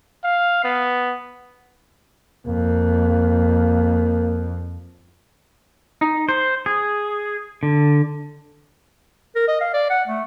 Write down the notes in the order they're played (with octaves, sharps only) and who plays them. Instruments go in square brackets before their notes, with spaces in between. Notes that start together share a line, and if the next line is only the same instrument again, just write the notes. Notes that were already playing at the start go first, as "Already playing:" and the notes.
[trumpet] F5
B3
[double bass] F2 [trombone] A#3
[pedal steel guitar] D#4
C5
G#4
D3
[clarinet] A#4
D#5
F5
D5
F#5
A3